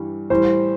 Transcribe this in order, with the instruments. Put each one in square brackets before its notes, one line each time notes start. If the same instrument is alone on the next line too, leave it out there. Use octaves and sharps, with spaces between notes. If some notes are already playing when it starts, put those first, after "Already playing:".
Already playing: [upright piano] G2 E3 G3
[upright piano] A2 E3 G3 [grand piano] C5